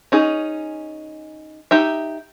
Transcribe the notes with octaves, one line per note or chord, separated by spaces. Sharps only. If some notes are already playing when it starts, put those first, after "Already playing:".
C#4 D#4 G#4
D#4 G4 E5